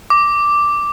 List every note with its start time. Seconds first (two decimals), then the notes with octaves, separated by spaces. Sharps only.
0.10 D6